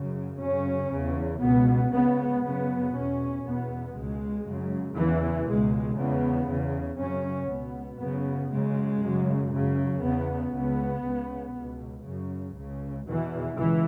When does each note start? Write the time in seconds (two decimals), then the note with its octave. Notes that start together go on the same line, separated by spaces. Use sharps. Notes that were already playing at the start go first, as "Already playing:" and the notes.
Already playing: F#2 C#3
0.40 F#2 C#3 C#4
0.91 E2 C#3
1.41 C#2 B2 B3
1.92 C#2 C#3 B3
2.43 F#2 C#3 B3
2.94 E2 B2 C#4
3.44 E2 B2 B3
3.94 C#2 B2 G#3
4.46 F#2 C#3
4.96 E2 C#3 E3
5.46 C#2 B2 G#3
5.97 E2 C#3 B3
6.48 E2 C#3
6.99 F#2 C#3 C#4
7.49 C#2 B2 B3
8.00 F#2 C#3 B3
8.51 F#2 C#3 G#3
9.01 F#2 C#3
9.52 F#2 C#3
10.02 E2 C#3 B3
10.53 C#2 C#3 B3
11.04 C#2 C#3
11.55 C#2 B2
12.05 F#2 C#3
12.56 C#2 C#3
13.06 E2 B2 E3
13.57 C#2 E3